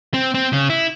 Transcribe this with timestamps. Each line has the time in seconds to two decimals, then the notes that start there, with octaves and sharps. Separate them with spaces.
0.14 C4
0.34 C4
0.53 C#3
0.70 E4